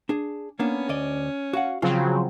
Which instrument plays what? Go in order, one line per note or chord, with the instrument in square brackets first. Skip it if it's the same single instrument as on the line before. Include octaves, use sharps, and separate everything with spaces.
[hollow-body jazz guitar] D4 G#4
[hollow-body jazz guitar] A#3 B3 D4 [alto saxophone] C#4
[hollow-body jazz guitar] D2 D5 D#5
F#4 F5 F#5
[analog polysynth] C#3 F#3 C4 [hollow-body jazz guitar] F3 F4